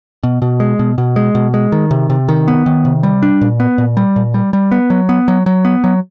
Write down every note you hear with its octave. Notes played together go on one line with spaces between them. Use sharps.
B2
B2
G#3
B2
B2
G#3
B2
G#3
D#3
C3
C3
D#3
B3
D#3
C3
G3
D4
A#2
B3
A#2
G3
A#2
G3
G3
B3
F#3
B3
F#3
F#3
B3
F#3